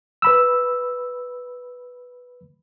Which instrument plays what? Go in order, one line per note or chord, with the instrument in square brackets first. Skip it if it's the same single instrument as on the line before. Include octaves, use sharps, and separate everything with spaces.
[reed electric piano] B4 B5 E6